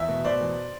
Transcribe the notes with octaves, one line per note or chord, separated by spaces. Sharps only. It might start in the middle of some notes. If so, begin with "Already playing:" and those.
Already playing: E2 E5
B2
B2 C5 D5
E2